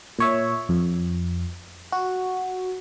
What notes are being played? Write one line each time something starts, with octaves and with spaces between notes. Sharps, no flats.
A#2 C#5 E5
F2
F#4